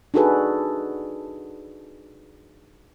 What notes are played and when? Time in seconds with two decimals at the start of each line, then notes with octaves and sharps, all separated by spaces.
0.14 D4 D#4 F#4 G#4 A4 B4